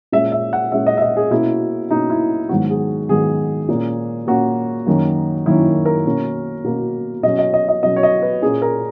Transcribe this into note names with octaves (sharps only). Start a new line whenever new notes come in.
A#2 G#3 C#4 E5
E5
F#5
A#2 G#3 C#4 E5
D#5
E5
D#5
G#4
B2 A#3 C#4 E4
B2 A#3 C#4 D#4
E4
G#2 D#3 F#3 B3 F#4
G#4
G#2 D#3 F#3 B3 G#4
A#2 A#3 C#4
A#2 A#3 C#4 F#4
F#2 D#3 A#3 C#4
F#2 D#3 A#3 C#4 E4
A#4
B2 A#3 C#4
B2 A#3 C#4
B2 F#3 C#4 D#5
D#5
D#5
D#5
B2 F#3 C#4 D#5
C#5
D#5
B4
A#2 A#3 C#4 G#4
A#4